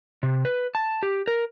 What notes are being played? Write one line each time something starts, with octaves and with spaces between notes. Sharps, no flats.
C3
B4
A5
G4
A#4